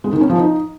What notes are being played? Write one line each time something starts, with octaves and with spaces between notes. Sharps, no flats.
G#3
D#3
C#4
F3
D#4